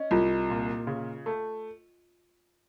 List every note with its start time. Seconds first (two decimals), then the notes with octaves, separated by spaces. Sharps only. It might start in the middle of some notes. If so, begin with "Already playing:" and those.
Already playing: C#4 D#5
0.11 C2 F4
0.50 A#2
0.87 C#3
1.26 A3